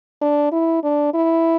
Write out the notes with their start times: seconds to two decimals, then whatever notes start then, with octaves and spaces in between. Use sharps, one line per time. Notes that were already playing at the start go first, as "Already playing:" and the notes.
0.22 D4
0.52 E4
0.84 D4
1.14 E4